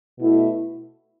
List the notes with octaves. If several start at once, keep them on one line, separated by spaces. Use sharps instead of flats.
B2 A3 E4